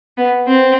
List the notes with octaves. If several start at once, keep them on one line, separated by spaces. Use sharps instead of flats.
B3
C4